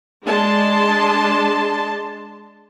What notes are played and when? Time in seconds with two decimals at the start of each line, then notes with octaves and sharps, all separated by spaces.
0.25 G#3 D4 A5 C6